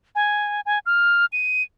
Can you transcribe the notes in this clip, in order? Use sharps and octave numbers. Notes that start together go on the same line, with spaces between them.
G#5
G#5
F6
D#7